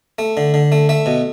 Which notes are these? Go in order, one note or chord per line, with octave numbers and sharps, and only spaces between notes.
A3
D3
D3
A3
A3 E5
B2